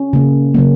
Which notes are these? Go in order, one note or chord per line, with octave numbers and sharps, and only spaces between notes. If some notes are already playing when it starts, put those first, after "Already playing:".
Already playing: C#4
C#3 A#3
C#3 F#3 A#3